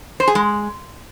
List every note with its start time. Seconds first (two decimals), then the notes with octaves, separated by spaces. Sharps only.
0.20 C5
0.28 G#4
0.35 G#3